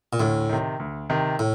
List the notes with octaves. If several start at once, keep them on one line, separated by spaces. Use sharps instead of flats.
A#2
D2 A2
C3 D#3
D2
C3 D#3
A2